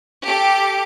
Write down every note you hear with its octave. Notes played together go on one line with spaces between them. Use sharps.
G4 A4 D7